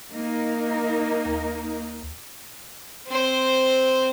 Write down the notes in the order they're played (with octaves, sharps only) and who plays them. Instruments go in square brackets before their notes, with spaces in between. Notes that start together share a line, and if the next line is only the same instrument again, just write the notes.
[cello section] A#3 D#4 A#4
[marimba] D#2
[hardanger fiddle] C4 C5